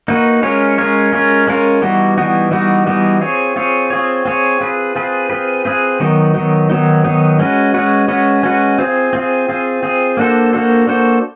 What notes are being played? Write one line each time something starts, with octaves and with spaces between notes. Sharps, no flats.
A#3 D#4 F#4 B4
G#3 C#4 F4 A#4 C#5
G#3 C#4 F4 A#4 C#5
G#3 C#4 F4 A#4 C#5
G#3 C#4 F4 A#4 C#5
E3 G3 B3 D#4 F#4
E3 G3 B3 D#4 F#4
E3 G3 B3 D#4 F#4
E3 G3 B3 D#4 F#4
C4 F4 G#4 C#5
C4 F4 G#4 C#5
C4 F4 G#4 C#5
C4 F4 G#4 C#5
C4 F4 G#4 B4
C4 F4 G#4 B4
C4 F4 G#4 B4
C4 F4 G#4 B4
D#3 F#3 B3 D#4
D#3 F#3 B3 D#4
D#3 F#3 B3 D#4
D#3 F#3 B3 D#4
G#3 C#4 F#4 B4
G#3 C#4 F#4 B4
G#3 C#4 F#4 B4
G#3 C#4 F#4 B4
C4 F4 G#4
C4 F4 G#4
C4 F4 G#4
C4 F4 G#4
A#3 D4 F#4 A4 C5
A#3 D4 F#4 A4 C5
A#3 D4 F#4 A4 C5